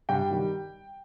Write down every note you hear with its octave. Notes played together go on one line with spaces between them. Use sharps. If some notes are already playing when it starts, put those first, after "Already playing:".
G2 G5
D#3 G3